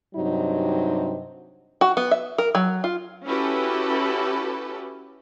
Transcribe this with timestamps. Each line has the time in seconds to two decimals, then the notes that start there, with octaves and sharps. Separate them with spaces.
0.15 G2 C3 F#3 D#4
1.81 F#4
1.97 B3
2.11 E5
2.38 A#4
2.55 F#3
2.84 F4
3.25 C#4 E4 F#4 G4 A4 B4